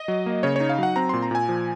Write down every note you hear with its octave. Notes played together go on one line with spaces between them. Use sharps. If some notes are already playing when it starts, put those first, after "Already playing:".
Already playing: D#5
F#3
A#3
C#3 C#5
D#4 C#5
F5
F#3 F#5
C4 A#5
A#2 C6
A#5
A#2 G#5
F3